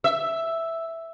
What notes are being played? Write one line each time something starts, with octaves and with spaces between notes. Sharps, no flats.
E5